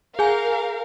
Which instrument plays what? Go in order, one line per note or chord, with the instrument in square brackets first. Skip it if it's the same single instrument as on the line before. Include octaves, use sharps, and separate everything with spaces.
[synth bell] G#4 G#5 [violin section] A#4 F5